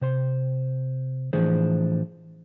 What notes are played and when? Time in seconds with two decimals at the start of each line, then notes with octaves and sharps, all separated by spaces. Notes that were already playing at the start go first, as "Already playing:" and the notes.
0.02 C3 C5 C6
1.33 A2 E3 F3 D4 G#4 C5